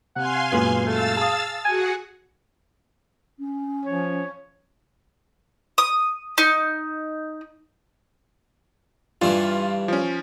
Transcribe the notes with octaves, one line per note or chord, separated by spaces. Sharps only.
C3 F5 F#5 G#5 C6
F#2 A#2 G#3 B3
A3 F5 E6 A6
G#4 A5 D#6
F#4 G#4 F#5 G#5
C#4
F3 C#5
D#6
D#4
G2 E3 F4
F3 C#4